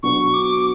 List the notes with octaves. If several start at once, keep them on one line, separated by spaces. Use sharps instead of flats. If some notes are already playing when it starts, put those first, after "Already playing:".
B2 F#3 B3 D4 F#4 C#6
D6